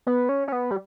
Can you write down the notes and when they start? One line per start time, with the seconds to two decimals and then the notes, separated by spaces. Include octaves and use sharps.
0.07 B3
0.29 C#4
0.48 C#4
0.52 B3
0.71 G3